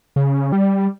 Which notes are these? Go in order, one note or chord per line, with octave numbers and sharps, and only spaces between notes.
C#3
G3